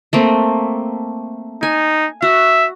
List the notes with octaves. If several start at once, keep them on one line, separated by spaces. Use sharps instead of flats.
A3 A#3 C4
D#4 G#5
F#4 E5